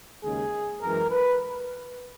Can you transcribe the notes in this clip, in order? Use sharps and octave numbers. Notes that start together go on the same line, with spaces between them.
D#2 C#3 G#3 G#4
F#2 E3 G#3 A#4
B4